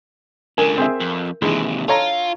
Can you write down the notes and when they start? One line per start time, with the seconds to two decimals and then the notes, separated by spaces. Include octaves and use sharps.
0.58 C#2 D3 A#4 G#5
0.78 C4 G#4 E5
1.00 F2
1.42 D#2 C3 E3 G#3 D4 A5
1.88 F4 A4 C#5 A#5